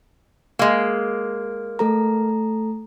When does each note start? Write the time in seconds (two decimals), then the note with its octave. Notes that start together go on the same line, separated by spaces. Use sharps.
0.59 G#3 A#3
1.79 A3 A4 A#5